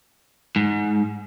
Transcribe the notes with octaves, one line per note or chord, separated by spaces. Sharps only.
G#2